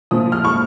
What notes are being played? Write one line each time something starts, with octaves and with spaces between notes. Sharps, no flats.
A#2 F3 D#6
F6
C#6